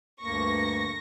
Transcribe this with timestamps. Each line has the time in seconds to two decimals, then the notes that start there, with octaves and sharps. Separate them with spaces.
0.23 D2 G2 A#3 C#6 A#6